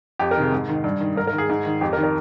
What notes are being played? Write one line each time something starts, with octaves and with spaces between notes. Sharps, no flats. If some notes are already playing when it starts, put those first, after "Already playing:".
F2 G4
A#4
C3 D#3 G#4
G#2
D#3
G2
D#3
G#2 A#4
A#4
D#3
G#4
G#2
D#3
F2 G4
A#4
D#3
A#4